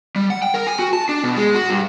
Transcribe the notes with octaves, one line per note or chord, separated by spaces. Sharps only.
G3
F#5
G5
A#4
G#5
F#4
A5
D4
B2
G#3
F#4
G2